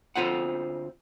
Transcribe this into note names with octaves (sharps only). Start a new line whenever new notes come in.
D2 C4 F4 C5 F#5